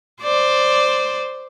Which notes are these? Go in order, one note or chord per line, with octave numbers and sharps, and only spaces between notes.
C5 D5